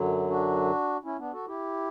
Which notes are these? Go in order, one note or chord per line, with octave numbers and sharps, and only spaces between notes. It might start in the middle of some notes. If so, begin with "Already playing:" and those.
Already playing: F#2 D3 F#3
D4 F#4
C#4 E4
B3 D4
F#4 A4
E4 G4